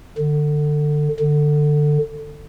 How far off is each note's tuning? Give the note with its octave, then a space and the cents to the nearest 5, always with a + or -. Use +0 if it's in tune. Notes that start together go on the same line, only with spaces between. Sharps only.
D3 +25
D3 +20